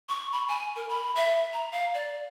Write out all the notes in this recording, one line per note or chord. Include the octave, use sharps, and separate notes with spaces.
C#6
B5
G#5
A#4
B5
E5
A#5
F5
D5